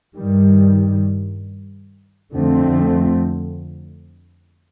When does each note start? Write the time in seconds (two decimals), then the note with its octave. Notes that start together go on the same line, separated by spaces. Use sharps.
0.17 G2 D#3 G3
2.33 F2 D3 F3 A3 C4